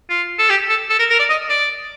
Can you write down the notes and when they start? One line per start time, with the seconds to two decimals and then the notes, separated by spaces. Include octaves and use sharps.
0.10 F4
0.39 A4
0.49 G4
0.69 A4
0.89 A4
0.99 A#4
1.10 A#4
1.19 D5
1.29 D#5
1.49 D5